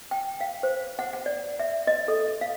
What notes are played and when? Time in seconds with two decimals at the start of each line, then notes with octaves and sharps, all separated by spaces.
0.11 G5
0.41 F5
0.63 C5
0.99 F#5
1.13 F#5
1.26 D5
1.59 E5
1.87 D#5
2.08 A4
2.41 F5